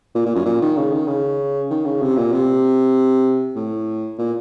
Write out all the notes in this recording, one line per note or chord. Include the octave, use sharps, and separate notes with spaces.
A#2
A#2
F#2
A#2
D#3
C#3
D#3
C#3
D#3
C#3
C3
A#2
C3
A2
A#2